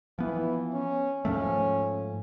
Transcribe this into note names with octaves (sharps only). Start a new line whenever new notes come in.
E3 F3 B3
C#4
G#2 F3 A3 C#4